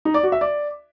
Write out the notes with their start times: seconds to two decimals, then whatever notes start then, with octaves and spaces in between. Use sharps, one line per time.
0.05 D#4
0.14 D5
0.23 F#4
0.32 E5
0.41 D5